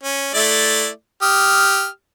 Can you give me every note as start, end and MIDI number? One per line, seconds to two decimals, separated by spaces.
0.03 0.29 61
0.34 0.88 57
0.34 0.88 64
0.34 0.88 74
1.22 1.87 67
1.22 1.87 87
1.22 1.87 89